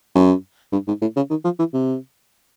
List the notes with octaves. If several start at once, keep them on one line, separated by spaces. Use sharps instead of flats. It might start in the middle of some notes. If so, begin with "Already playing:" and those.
F#2
G2
G#2
A2
C#3
D#3
F3
E3
C3